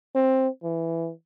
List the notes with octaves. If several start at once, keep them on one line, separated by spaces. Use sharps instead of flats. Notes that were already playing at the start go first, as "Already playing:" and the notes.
C4
E3